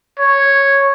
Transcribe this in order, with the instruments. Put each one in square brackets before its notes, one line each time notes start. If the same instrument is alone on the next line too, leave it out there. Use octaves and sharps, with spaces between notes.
[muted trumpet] C#5